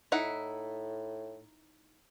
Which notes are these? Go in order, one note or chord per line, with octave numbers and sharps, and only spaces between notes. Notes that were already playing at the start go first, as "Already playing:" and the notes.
A2 D#4 E4 F#5